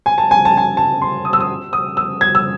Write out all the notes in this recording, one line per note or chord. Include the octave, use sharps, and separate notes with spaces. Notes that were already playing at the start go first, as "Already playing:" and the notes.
G#5
A5
G#5
A5
G#5
A5
C6
D#6
E6
D#6
D#6
E6
G#6
E6